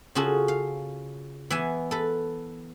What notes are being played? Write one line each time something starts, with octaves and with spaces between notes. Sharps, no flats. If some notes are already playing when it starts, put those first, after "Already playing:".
C#3 F4 F#4 G#4 A4
F5
E3 B3 E5 G#5
A4 B4